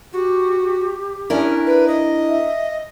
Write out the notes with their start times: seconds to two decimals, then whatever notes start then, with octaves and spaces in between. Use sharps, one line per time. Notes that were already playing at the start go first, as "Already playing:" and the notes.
0.13 F#4 G4
1.30 C#4 D4 E4 A#4
1.66 B4
1.88 D#5
2.29 E5